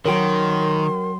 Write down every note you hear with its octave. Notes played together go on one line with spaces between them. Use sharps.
D#3 F#3 F#4 A#4 C#5 G5 C6